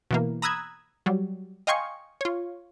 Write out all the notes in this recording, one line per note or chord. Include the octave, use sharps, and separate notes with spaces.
B2 E3 A#3
A#5 B5 D#6 E6 F#6 G#6
F#3 G3
D#5 F5 G5 G#5 C6 C#6
F4 C#5